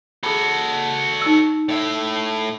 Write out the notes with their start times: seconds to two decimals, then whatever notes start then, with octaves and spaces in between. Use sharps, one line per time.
0.23 F#4 G#4 A4 B5
1.22 D#4 E6
1.69 A2 E5